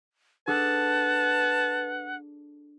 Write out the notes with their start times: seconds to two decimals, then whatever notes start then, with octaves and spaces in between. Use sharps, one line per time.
0.48 D4 G#4 A4 B4 F#5 A5